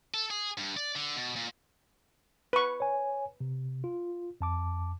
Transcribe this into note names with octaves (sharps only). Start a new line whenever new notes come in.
A4
G#4
G2
D5
D3
B2
A#2
B4 C#6
C#5 G#5
C3
F4
F2 A5 D6